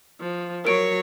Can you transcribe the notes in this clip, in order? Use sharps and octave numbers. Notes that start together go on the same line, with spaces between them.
F3
F#3 A#4 C#5 D7